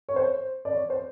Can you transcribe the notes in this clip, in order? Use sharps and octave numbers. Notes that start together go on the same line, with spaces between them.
C#5
C5
D5
C#5
C5